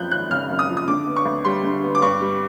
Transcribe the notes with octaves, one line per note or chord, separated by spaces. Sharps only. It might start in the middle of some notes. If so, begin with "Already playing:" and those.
Already playing: F#2 F3 F#6 G6
G#1 F#6
C#3 F6
F#2
D#6
F3
D#6
D3 D6
B3
C#6
D2
G3 C6
D3
B3
D6
G2 C#6
G3